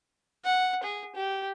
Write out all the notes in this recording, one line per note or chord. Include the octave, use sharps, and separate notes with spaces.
F#5
G#4
G4